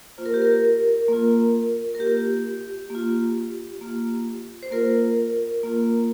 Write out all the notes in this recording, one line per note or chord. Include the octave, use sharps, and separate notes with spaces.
A#3 F4 C5
A#4
G4
A#4
A#3 F4
A#4
A#3 F4 G4
A#3 F4
A#3 F4
C5
A#3 F4 A#4
A#3 F4